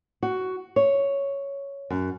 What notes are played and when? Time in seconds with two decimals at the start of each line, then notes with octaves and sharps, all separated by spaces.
0.23 F#4
0.76 C#5
1.90 F#2